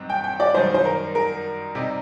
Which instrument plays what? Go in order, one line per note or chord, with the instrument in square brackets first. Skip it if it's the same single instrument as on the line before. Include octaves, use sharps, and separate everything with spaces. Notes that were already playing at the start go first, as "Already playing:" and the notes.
Already playing: [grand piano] G2 F#3 C4 D#4
[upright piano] G5
G5
D5
[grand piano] F#2 D#3 G3 [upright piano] C5
[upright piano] C5
A#4
A#4
[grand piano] C3 G3 C4 D#4